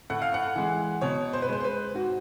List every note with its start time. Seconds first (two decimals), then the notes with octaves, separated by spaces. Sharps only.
0.10 A2 F#5
0.22 F5
0.34 F#5
0.56 E3 G#3
1.01 B2 C#5
1.33 C5
1.42 B4
1.49 G#3 C5
1.60 C5
1.64 B4
1.94 G#2 F#4